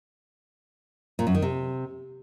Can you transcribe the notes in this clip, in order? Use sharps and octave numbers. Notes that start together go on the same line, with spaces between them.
A#2
F#2
D#3
C3